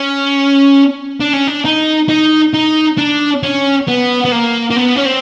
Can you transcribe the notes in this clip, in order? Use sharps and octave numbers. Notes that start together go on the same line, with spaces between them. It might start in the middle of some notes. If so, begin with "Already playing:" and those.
Already playing: C#4
D4
C#4
D4
D#4
D#4
D#4
D4
C#4
B3
B3
A#3
A#3
B3
C#4
C4